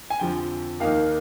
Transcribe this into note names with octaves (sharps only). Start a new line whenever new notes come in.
G#5
F2 D3 F3 G5
D#2 D#3 A#3 D#4 F5